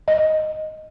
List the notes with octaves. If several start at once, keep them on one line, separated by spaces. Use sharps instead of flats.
D#5